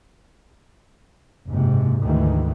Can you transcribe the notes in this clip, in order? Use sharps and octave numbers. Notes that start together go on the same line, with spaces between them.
F#1 G#2 C3
D2 G#2 D#3 E3